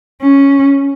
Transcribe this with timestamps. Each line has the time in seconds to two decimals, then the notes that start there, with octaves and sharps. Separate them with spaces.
0.23 C#4